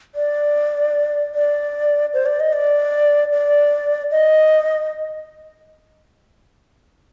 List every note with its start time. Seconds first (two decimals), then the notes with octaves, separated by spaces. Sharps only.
0.15 D5
1.35 D5
2.14 C5
2.26 D5
2.40 D#5
2.53 D5
3.32 D5
4.11 D#5